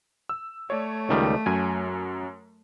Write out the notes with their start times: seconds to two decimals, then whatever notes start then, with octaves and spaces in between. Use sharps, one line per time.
0.29 E6
0.70 A3 C#5 D5
1.09 C#2 D#3 G3
1.46 F#2 F#3 G#5